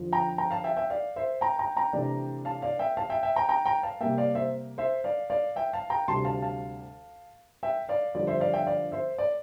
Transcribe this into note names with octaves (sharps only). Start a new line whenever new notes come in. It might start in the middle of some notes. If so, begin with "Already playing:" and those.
Already playing: F2 D3 F3
G5 A#5
G5 A#5
F5 A5
E5 G5
E5 G5
D5 F5
C5 E5
G5 A#5
G5 A#5
G5 A#5
C3 E3 A3 D4
F5 A5
D5 F5
E5 G5
F5 A5
E5 G5
E5 G5
G5 A#5
G5 A#5
G5 A#5
F5 A5
C3 G3 A#3 E5 G5
D5 F5
C5 E5
C5 E5
D5 F5
D5 F5
E5 G5
F5 A5
G5 A#5
D2 C3 G3 A5 C6
F5 A5
F5 A5
E5 G5
D5 F5
F2 D3 G3 D4 D5
C5 E5
D5 F5
E5 G5
D5 F5
C5 E5
D5